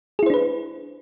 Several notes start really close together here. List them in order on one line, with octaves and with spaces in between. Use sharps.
G#4 E4 C5 D4 B4